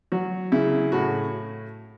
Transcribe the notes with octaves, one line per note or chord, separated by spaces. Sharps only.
F#3 F#4
C#3 E4
A2 F#4